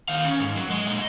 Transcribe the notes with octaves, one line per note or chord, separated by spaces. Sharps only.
D#3 F5
C#4
G#2
F#3
G#3 D#5
A#2